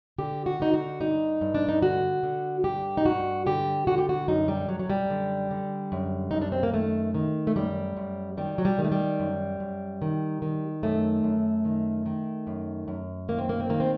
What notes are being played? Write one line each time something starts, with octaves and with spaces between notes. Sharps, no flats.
D3 G4
F#4
D3 D#4
F#4
G2 D#4
G2
D4
D#4
D3 F#4
D3
G2 G4
D#4
G2 F#4
D3 G4
D3 F#4
G4
F#4
F#2 D#4
G3
F#2 F#3
F#3
G3
D3
D3
F#2
F#2 D#4
D4
C4
A#3
D#3 A3
D#3
A3
F#2 G3
F#2
D#3 G3
F#3
G3
D#3
A3
G3
F#2
F#2
D#3
D#3
F#2 A3
F#2
D#3
D#3
F#2
F#2
D#3 A#3
C4
A#3
C4
D#3 A#3
C4